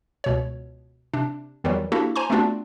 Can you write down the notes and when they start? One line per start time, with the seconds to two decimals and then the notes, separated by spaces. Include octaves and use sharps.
0.24 C#2 B2 C#5
1.14 C3 D4
1.64 E2 D#3 E3 F#3 G3
1.92 A#3 D4 E4 F#4 G4 A4
2.16 C5 G#5 A#5 C6 C#6
2.30 A3 B3 C4 D4 F4 F#4